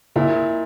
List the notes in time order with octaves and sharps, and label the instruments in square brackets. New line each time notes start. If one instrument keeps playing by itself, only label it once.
[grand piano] A#2 [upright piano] E4